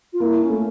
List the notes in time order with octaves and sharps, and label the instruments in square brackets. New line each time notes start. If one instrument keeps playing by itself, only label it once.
[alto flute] F4
[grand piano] A#3 [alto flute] E4
[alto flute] C#4
[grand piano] A3